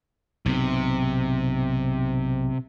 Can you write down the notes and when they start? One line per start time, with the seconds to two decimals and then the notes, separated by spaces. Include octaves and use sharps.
0.46 B1 G#2 C3